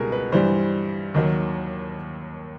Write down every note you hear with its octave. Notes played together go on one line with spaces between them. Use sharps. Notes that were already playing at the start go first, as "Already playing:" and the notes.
Already playing: C#2 B2 G3 G#4 A#4
B4
G2 E3 G3 C5
D#2 D#3 F#3